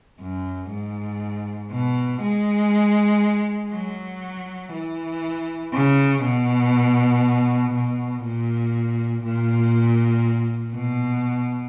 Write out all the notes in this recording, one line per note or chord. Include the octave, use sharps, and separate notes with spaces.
F#2
G#2
B2
G#3
F#3
E3
C#3
B2
B2
A#2
A#2
B2